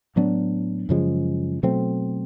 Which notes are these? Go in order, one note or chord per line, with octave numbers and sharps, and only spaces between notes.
A2 F#3 B3 D4
F#2 C#3 F3 G#3
B2 F#3 A3 C4